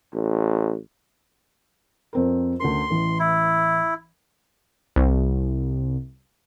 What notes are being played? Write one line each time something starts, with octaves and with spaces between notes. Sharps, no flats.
A1
F2 C4 A#4
D2 C#4 A#4 C6
A1 E3
E4
C2